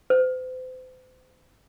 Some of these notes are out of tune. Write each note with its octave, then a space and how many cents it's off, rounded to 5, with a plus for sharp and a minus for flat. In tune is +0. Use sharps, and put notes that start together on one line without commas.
C5 -40